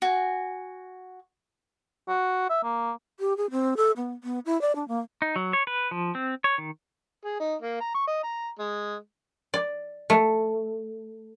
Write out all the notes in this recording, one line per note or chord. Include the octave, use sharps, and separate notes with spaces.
F#4 G#5
F#4
E5
A#3
G4
G#4
C4
A4
B3
B3
E4
D5
D4
A#3
D#4
F#3
C#5
B4
F3
C4
C#5
D#3
G#4
D#4
A#3
A#5
C#6
D#5
A#5
G#3
D5
A3